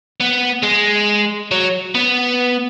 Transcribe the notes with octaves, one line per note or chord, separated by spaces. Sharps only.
B3
G#3
F#3
B3